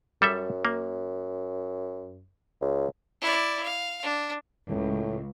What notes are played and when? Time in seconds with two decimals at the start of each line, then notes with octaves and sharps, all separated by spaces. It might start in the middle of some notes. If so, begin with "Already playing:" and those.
0.22 F#2 G3 A4 E5
0.65 A#3
2.61 C#2
3.21 E4 D5
3.63 F5
4.03 D4
4.68 C#2 A2